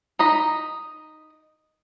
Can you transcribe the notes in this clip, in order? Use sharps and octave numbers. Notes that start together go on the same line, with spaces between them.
D#4 D#5 B5